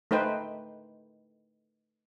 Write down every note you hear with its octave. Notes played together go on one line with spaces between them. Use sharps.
A3 D#4 B4 C5 G5